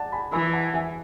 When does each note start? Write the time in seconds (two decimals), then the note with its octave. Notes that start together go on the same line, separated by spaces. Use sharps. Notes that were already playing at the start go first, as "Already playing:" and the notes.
Already playing: D5 F#5 A5
0.12 G#5 B5
0.32 E3 G#5 B5
0.53 F#5 A5
0.74 E5 G#5